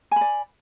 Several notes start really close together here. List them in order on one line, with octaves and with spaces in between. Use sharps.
G#5 B5 D5